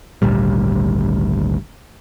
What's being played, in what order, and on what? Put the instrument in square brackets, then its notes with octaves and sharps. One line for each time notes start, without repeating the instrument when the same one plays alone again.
[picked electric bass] G#1 D2 A#2 G3